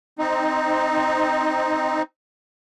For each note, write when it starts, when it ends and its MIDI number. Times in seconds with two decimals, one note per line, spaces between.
0.19 2.02 60
0.19 2.02 63